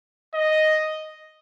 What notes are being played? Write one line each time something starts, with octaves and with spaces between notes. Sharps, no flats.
D#5